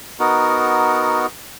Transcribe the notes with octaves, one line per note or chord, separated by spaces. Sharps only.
B3 D#4 F#4 A#4